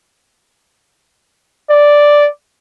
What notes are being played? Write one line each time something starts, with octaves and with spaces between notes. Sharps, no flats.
D5